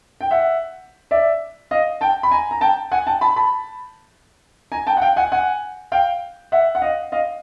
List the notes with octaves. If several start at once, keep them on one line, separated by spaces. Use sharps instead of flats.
G5
E5 F#5
D5 E5
D#5 F5
G5 A5
B5
G#5 A#5
A#5
G5 A5
F#5 G#5
G5 A5
A5 B5
A5 B5
G#5 A#5
G5 A5
F#5
F5 G5
F#5 G#5
F#5 G#5
F5 G5
E5 F#5
F#5
D#5 F5
D#5 F5